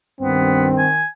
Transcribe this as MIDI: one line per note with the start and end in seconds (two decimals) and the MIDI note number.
0.20 0.83 36
0.20 0.83 43
0.20 1.02 51
0.20 0.66 59
0.20 0.89 60
0.78 1.07 80